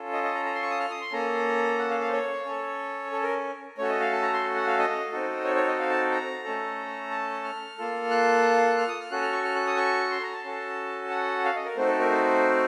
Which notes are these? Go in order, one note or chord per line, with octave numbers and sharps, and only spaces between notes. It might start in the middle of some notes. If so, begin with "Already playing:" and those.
Already playing: C#4 F4 A4
D#5
D#5
A#5
A#5
C6
C#6
D#6
F6
D#6
C6
A#3 C#4 A4 A#5
F#5
F5
F5
C5
C#5
C#4 A4
A4
A#4
A3 C#4 F#4 A4 C#5
D#5
F5
A5
A#5
C6
F#5
F5
D#5
C4 D#4 F#4 A4
C#5
C#5
D#5
F5
A5
A#5
A3 C#4 A4
A5
F6
A#3 F4 A4
F#6
F6
D#6
F6
C#4 F#4 A4 F#6
F6
C#6
F6
F#6
D#6
C#6
C6
A#5
A5
C#4 F#4 A4
F#5
F5
D#5
A#4
A3 C4 D#4 F#4 C5
A4
A#4
C5